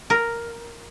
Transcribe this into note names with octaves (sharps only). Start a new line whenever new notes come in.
A#4